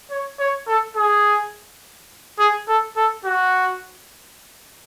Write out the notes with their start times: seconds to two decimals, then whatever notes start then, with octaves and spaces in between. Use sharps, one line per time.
0.11 C#5
0.39 C#5
0.68 A4
0.96 G#4
2.39 G#4
2.68 A4
2.96 A4
3.25 F#4